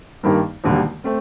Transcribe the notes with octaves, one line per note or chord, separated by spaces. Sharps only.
G2 D#3 G3 A#3
E1 D#2 D3 G3
A3 C4